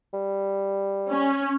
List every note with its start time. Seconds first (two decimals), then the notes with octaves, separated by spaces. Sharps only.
0.13 G3
1.09 C#4